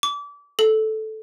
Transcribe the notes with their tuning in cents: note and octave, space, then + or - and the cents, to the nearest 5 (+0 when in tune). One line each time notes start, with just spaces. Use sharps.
D6 -30
A4 -10